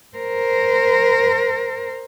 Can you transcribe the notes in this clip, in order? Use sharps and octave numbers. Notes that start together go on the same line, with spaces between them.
A#4 C5